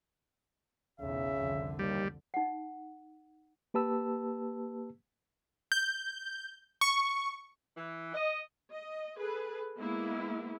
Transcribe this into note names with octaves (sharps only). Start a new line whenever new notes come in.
B1 E2 C#3 E5
C2 F2 D3
D#2 G3
D#4 F#5
A#3 G4 B4 A5 E6
G6
C#6
E3
D#5
D#5
G#4 A4 B4
G#3 A#3 B3 E4